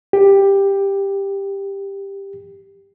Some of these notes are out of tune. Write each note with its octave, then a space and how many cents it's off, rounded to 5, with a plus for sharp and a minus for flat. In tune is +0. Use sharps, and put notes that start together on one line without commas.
G4 +10